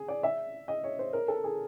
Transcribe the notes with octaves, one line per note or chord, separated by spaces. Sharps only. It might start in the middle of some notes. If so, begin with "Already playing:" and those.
Already playing: G#4
D5
E5
D#5
C#5
C5
A#4
A4
G#4